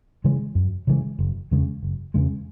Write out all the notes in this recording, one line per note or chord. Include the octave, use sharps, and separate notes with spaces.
C#3 E3 G#3
F#2
C#3 E3 G#3
F#1
E2 C#3 G#3
F#1
E2 C#3 G#3